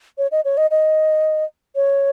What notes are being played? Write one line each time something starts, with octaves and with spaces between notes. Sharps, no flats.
C#5
D#5
C#5
D#5
D#5
C#5